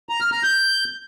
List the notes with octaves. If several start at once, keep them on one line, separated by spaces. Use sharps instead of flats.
A#5
F6
A#5
G6